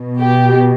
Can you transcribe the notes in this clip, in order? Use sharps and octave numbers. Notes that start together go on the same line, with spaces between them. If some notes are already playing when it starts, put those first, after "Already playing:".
Already playing: B2
G4